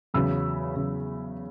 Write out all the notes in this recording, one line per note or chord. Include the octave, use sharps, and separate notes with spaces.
E2 C#3 F#3 B5 E6
C#3 F#3